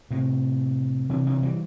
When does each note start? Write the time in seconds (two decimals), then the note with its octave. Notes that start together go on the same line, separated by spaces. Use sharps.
0.11 A2 C3
1.09 C3 E3
1.26 C3 E3
1.43 E3 G3